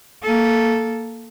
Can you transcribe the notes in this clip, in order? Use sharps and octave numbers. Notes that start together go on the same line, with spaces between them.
A#3 A4